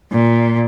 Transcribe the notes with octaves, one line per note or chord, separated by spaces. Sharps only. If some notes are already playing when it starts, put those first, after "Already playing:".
A#2